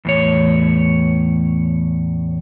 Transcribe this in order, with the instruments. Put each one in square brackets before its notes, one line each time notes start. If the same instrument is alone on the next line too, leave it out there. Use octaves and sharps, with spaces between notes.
[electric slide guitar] E2 A2 C#5